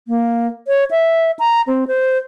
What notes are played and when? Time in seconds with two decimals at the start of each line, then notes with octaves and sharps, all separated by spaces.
0.08 A#3
0.68 C#5
0.91 E5
1.39 A#5
1.68 C4
1.88 C5